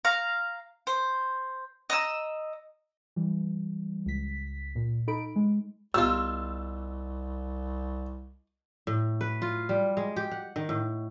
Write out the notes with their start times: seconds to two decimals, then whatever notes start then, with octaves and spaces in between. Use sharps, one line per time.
0.05 F5 A#5
0.87 C5
1.90 D#5 A#5 E6
3.16 E3 G3
4.06 C#2 B6
4.75 A#2
5.07 D#4 A4 B5 D7
5.36 G#3
5.94 C2 B3 D#4 F4 G4 E6
8.87 A2
9.21 B4
9.42 F4
9.69 G3
9.97 G#3
10.16 G4
10.31 F#5
10.56 D#3
10.69 A2